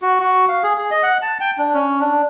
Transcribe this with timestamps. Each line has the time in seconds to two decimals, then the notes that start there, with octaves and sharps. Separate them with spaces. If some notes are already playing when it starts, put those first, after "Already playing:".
0.02 F#4
0.20 F#4
0.49 F5
0.63 G#4
0.78 G#4
0.91 D#5
1.03 F#5
1.22 A5
1.40 G5
1.58 D4
1.74 C#4
2.00 D4